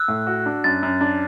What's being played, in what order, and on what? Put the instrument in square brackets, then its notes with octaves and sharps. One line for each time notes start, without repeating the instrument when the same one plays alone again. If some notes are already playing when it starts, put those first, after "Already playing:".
Already playing: [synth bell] E6 F#6
[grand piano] A2
F#4
D4
[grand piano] F#2 [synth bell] A6
[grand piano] F#2
D4